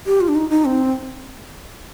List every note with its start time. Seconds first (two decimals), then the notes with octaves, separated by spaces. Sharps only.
0.06 G4
0.21 F4
0.28 D4
0.35 D#4
0.50 D#4
0.65 C4